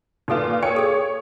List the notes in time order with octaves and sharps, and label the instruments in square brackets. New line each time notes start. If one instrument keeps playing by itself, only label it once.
[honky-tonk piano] A#2 F4 [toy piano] D#4 A4 B4
[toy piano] A#4 G5 [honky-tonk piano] C#5 C#7
[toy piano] G#4 A4